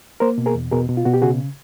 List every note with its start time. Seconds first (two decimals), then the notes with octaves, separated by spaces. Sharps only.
0.20 A#3 A#4 C5
0.38 B2
0.46 G#4 A#4
0.55 E2
0.71 B2 G#4 A#4
0.89 B2
0.97 F4
1.05 B2 F#4
1.14 G4
1.22 C#3 F#4 G#4